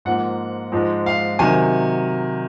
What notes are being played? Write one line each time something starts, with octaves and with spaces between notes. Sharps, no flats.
G#2 F3 A#3 F#5
G#2 F3 G#3
F5
C3 D#3 F#3 G#5